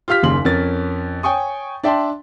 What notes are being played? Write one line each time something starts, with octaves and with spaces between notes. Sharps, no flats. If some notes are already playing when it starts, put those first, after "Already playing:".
F4 G4 F5 F6 B6
F#1 D#2 C#3 C6 F#7
F2 C#4 A#4 A6
C#5 G5 G#5 C#6 D#6
D4 D5 E5 G5 A5 C6